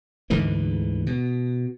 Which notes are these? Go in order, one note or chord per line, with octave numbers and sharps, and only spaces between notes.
D2 G#2 D3 E3
B2